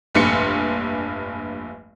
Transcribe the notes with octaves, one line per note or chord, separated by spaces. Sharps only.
F1 A#1 G2 C6 C#7